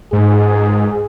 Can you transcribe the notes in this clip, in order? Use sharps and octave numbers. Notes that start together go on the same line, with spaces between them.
G#2 G#4